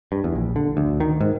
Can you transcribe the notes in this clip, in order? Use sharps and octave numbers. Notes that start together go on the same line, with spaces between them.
G2
E2
A#1
D3
D2
D#3
G#2